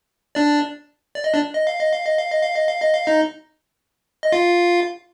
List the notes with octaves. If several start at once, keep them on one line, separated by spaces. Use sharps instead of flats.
D4 D5
D5
D#5
D4 D5
D#5
F5
D#5
F5
D#5
F5
D#5
F5
D#5
F5
D#5
F5
D#4 D#5
D#5
F4 F5